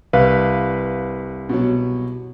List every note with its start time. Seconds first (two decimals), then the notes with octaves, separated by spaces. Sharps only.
0.13 C2 B4 F5
1.49 B2 F#3